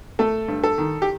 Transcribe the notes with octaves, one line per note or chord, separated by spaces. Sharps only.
A3 A4
G2
A4
D#3
G4